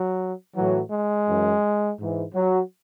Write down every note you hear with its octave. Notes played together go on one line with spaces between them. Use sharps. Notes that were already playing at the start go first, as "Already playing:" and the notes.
Already playing: F#3
A2 E3 F#3
G#3
F#2 E3
G#2 E3
F#3